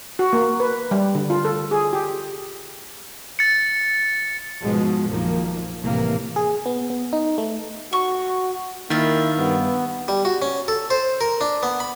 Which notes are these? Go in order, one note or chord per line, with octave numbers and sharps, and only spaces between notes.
F#4
A#3
B4
G3
D3
F4
A4
G#4
G4
A6 C#7
G#2 B2 F3 G#3
A#1 F#2 D#3 F3 A#3
C2 A2 C3 E3 A#3
G#4
B3
B3
D#4
A3
F#4 C#6
D#3 A#3 E4 F4 E5
G2 B3
G3
F#4
C#4
A4
C5
A#4
D4
B3
B5